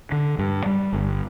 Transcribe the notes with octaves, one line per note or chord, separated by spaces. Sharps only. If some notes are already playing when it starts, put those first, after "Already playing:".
D3
G2
G3
G1